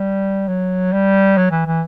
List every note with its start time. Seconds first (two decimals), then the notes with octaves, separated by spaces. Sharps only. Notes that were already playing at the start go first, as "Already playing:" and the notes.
Already playing: G3
0.48 F#3
0.93 G3
1.37 F#3
1.51 E3
1.67 E3